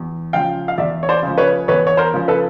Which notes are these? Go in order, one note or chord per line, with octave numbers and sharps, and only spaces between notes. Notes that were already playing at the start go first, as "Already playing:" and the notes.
Already playing: E2
C#3 F3 F5 G5
F5
E2 D5 E5
C#5
C5 D5
C#3
F3
B4 C#5
E2 B4 C#5
C#5
A#4 C5
C#3 F3
A4 B4